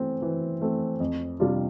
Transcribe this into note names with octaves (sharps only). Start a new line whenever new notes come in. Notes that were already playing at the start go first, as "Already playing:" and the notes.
Already playing: E3 A3 C4
E3
A3 C4
F2
C3 G3 D4 F4